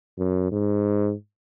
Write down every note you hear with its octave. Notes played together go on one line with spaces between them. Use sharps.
F#2
G#2